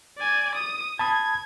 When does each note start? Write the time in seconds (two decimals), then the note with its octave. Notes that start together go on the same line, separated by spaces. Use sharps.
0.18 D5 G#5
0.55 D#6
0.99 A5 B5 D#6 G#6